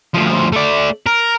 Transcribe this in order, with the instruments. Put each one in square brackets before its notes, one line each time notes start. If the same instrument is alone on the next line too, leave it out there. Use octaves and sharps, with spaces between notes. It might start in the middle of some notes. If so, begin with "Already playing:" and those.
[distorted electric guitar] D2 F3
A3 D5
A#4